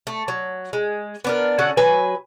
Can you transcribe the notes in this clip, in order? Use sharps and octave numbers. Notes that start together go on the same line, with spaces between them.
A3
F#3
G#3
B3 D4 A#4
D3 C#4 F#4 F#5
F#3 B4 G#5